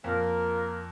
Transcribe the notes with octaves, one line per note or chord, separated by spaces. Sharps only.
F2 A#3 F4 A#4